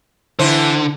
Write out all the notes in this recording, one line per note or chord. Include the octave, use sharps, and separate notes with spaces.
D3 E3 E4 C5